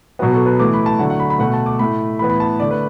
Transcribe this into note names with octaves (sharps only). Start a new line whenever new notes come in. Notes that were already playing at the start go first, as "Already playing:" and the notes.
B2 F#3 B3 F#4
A4
B4
A2 E3 A3 D6
B5
A5
D3 F#3 A3 F#5
F#5
B5
B5
B2 A3 F#5
A5
D6
A2 A3 B5
A2 E3 B3 B5
B5
A5
D3 A3 D5
B4